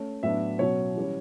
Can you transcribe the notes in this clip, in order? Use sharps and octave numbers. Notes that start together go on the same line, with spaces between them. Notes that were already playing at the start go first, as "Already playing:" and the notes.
Already playing: A3 C#4
A2 F#3 B3 D4 E5
B2 F#3 C#4 C#5
E3 G3 C#4